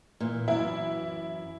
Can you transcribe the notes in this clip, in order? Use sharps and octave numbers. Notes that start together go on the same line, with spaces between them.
A#2 E3
F#2 E3 E4